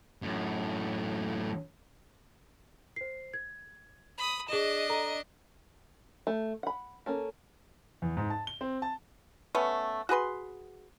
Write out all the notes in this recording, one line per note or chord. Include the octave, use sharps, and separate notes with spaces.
F#2 A2
C5 C7
G#6
B5 D#6
D4 G#4 D#5 E7
A4 A#5
A3
F#5 B5
A#3 C#4 A4
E2
G#2
A5
G7
C4
A5
A3 B3 C#4
F#4 G#4 B4 C6